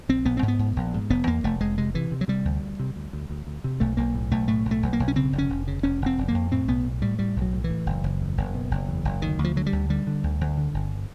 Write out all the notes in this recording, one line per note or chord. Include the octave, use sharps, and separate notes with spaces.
A#1 C4
A#1 B3
C4
G#2
B3
G#2
A#1
G#2
F1 B3
E2 A#3
F1 A3
F1 G#3
C3 G#3
C3 E3
C3
F#3
C3 G3
D2
D2
C3
D2
D2
D2
D2
C3
B1 A3
B1 A#3
A2
B1 A3
A2 A3
B1
A3
B1
A#3
B1
C#4
C#3 C4
F1
C#4
F1
C#3
F1 C#4
F1 C4
F1
A#3
F2
A2 C4
B1 B3
A2
A2 G3
A2 G3
B1
F#3
A2
E3
A2
F#1
F#1
E2
F#1
B2
F#1
E2
F#1
D2 D#3
D2
F3
D3 F#3
G3
D2
D3 G3
D3
D2
D2
D3
G1